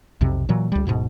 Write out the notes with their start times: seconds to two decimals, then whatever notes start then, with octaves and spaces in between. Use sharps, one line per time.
0.21 B1 F2 C3
0.49 A#2 E3 F#3
0.72 C#2 G3
0.87 D1 A#1 G#2 B2